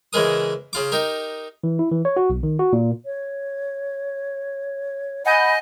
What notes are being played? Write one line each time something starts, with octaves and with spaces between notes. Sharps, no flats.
C#3 E3 G#3 A#4 D#6
C#3 F4 D6
D#4 G4 A#4
E3
E4
E3
C#5
F#4
B1
D#3
F#4
A#2
C#5
D#5 F#5 G#5 B5 G6